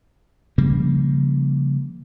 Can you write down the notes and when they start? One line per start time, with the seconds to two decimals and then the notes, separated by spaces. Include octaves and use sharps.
0.58 C#3 F3 G3 A#3